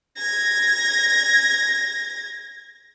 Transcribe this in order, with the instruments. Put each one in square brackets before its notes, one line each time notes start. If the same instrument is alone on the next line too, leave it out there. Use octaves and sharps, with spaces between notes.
[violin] G#6 A#6